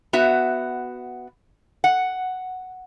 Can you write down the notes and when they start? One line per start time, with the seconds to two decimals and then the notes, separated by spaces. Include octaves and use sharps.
0.13 B3 F#4 E5
1.84 F#5